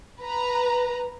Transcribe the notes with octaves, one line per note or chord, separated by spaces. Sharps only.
B4 A#5